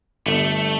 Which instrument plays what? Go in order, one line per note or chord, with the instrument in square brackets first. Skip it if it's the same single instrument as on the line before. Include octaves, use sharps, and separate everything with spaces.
[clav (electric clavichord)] G1 [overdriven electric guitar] A3